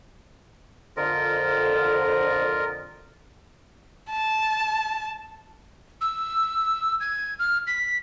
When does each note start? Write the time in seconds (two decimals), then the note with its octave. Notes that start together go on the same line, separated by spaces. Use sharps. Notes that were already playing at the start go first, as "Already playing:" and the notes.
0.97 F2 D3 F4 A#4 D#5
4.11 A5
6.01 E6
7.00 G#6
7.39 F6
7.67 B6